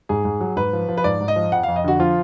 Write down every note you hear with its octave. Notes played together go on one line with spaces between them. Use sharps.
G#2 G#4
G#2
F#3
G#2 B4
F3
F3
B4
G#2 D5
G#2
D#5
F3
F2 F#5
F2 F5
D#5
D3 F#4
F3 F4